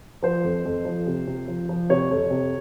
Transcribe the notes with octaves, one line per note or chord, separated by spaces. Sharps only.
F3 C5
F2
F2
F3
C3
C3
F3
F3
C3 C#5
F2
C3